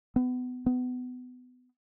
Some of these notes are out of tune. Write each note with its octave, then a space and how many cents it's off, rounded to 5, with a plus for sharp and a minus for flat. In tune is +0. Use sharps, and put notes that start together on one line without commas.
B3 +25
B3 +25